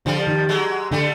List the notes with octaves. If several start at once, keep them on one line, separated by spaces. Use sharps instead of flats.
D3 F3 G3
D#3
F#3 G#3
D3 G3 A3